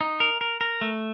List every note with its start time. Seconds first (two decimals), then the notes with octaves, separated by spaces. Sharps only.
0.01 D#4
0.20 A#4
0.41 A#4
0.61 A#4
0.81 A3